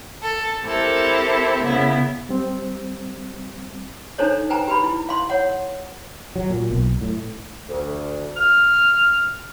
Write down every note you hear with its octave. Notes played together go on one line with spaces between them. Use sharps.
A4
C4 E4 G4 A4 A#4
C#3 B3 E4
G3 C4
D4 D#4 A4 C5 C#5
B4 C5 G5 G#5 A#5
G4 B4 B5
E4
F5 C6
C#5 F#5
F#3
A#2
B1
A2
D2
F6